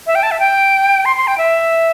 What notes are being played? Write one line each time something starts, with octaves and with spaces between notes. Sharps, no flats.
E5
G5
A5
E5
G5
C6
C6
G5
E5